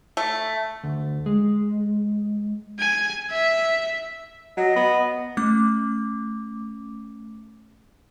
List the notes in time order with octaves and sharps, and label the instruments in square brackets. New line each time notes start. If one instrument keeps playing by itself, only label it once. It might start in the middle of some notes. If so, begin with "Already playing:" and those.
[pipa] A3
[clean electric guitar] D2
G#3
[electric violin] G#5
E5
[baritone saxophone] F#3 [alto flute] D#5
[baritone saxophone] B3
[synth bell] A3 C#4 D6